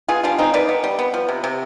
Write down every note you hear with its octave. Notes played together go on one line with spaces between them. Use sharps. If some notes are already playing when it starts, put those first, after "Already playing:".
B3 F4 G#4
G3 D4 F4
D#3 C4 D#4
D#3 B4 D5
B3
G3
B3
F3
C3
C3